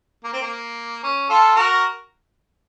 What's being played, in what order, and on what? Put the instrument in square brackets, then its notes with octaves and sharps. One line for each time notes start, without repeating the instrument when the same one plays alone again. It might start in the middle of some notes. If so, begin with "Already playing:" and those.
[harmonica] A#3
C4
A#3
C#4
F4 A4
F#4 A#4